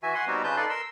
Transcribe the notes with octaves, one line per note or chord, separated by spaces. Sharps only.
E3 F#4 E5 G#5
F#5 G#5 C6
G3 B3 C4 D#4 F#4 G4
C#3 F4 B4 A5 G6
D#4 A4 B4 D5 C6
A#4 C6 E6